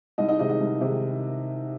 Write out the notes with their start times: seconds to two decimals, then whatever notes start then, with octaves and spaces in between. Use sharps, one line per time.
0.18 C2 D#4 D#5
0.28 D#4 D#5
0.39 C3 D#3 G#3 D#4 D#5
0.49 D#4 D#5
0.60 C2
0.81 C3 D#3 G#3